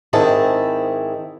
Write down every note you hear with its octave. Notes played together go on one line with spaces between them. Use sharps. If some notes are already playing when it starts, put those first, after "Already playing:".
G#2 D#3 C4 E4 G#4 A5